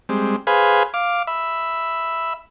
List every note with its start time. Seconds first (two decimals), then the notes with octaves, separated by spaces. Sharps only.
0.09 G3 G#3 C4
0.47 G#4 B4 C5 F5 G#5 B5
0.94 F5 D6
1.27 E5 B5